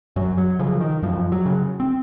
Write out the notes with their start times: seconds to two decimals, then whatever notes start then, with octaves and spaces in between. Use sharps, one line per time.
0.16 F#2 F#3
0.37 F#3
0.59 C#3 F3
0.81 D#3
1.02 F#2 F3
1.32 F#3
1.46 C#3
1.80 C4